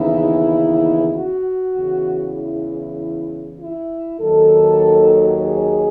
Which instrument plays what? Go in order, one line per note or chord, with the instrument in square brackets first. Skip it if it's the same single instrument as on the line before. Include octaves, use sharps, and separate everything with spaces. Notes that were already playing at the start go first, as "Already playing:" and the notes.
Already playing: [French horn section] D#2 C#3 E3 B3 D#4 E4
F#4
E2 C#3 E3
E4
E4
D#2 D#3 F#3 A4
G#4